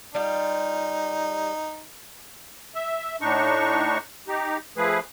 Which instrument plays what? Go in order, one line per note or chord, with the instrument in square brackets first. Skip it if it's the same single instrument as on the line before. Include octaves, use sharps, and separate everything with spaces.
[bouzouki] G3 F4 [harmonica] D#4
[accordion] E5
A2 D4 D#4 C#6
D#4 G4
F3 A3 G#4 B4